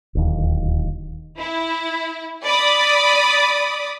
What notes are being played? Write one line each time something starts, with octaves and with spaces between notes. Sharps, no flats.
D1 D#2
E4
D5 B5 D6 D#6